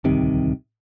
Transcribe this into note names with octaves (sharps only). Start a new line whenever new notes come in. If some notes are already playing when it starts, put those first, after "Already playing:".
D1 C2 C3 D#3